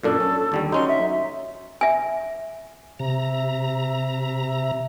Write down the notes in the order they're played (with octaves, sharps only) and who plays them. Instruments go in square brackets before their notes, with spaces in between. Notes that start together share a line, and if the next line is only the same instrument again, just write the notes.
[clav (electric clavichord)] F#2 A#2 D4 [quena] A4
[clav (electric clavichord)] C#4
D#2 D3 G3
[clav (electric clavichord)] F#3 C#4 D#4 [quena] C6
[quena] E5
[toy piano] E5 G#5
[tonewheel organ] C3 A#5 [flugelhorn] E5